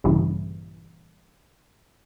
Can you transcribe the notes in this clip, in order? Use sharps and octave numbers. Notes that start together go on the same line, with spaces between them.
A#1 G2 C#3 E3